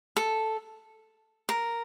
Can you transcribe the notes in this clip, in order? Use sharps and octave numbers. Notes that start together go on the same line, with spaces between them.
A4
A#4